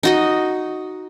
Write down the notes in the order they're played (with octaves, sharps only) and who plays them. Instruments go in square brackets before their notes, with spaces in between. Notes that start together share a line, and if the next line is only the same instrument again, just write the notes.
[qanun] D#4 F#4 D#5